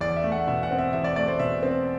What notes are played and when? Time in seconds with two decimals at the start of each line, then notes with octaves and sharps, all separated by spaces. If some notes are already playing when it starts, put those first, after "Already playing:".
0.01 E2 D5
0.16 E5
0.24 A3
0.32 F#5
0.48 B2 E5
0.63 F#5
0.71 C4
0.78 E5
0.93 E2 E5
1.04 D5
1.16 A3 D5
1.28 C5
1.39 B2 E5
1.63 C4